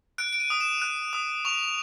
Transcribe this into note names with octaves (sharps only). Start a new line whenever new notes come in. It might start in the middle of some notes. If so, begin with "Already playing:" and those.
F#6 D7
D7
D#7
D#6
E7
F#6
D#6
C#6 F7